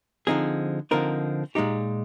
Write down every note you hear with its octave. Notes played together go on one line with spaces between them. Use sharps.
D3 F3 C4 D#4 G#4
D3 F3 C4 D#4 A#4
A#2 G#3 D#4 G4